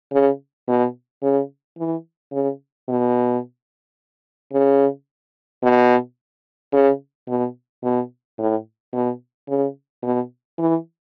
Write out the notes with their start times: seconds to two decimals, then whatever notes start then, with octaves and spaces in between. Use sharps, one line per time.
0.12 C#3
0.68 B2
1.23 C#3
1.78 E3
2.32 C#3
2.89 B2
4.53 C#3
5.63 B2
6.73 C#3
7.28 B2
7.83 B2
8.38 A2
8.93 B2
9.48 C#3
10.03 B2
10.58 E3